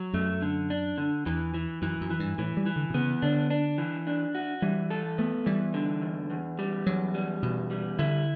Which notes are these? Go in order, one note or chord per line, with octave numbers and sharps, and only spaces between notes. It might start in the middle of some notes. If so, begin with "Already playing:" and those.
Already playing: F#3
F#2 A3
D3
D4
D3
E2 E3
E3
F#2 E3
F#2
E3
G2
A2 E3
G3
E3
D3
B2
C#3 B3
D3 D4
D4
E3
D4
F#4
E3 G3
A4
A3 B3
E3 G3
D3
E2
E2
G3
E2 F#3
G3
E2 B2
G3
D3 E4